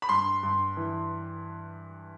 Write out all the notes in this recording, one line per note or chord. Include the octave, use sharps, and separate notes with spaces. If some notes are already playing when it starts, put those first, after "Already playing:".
B5
G2 C6
G2
E3